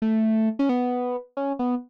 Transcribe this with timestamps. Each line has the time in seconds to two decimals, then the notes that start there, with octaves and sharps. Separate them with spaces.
0.02 A3
0.59 C#4
0.69 B3
1.37 C#4
1.59 B3